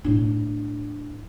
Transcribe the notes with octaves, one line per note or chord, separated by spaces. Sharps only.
A2 D4